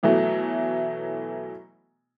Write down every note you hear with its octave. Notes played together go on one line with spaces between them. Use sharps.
B2 E3 F#3 A3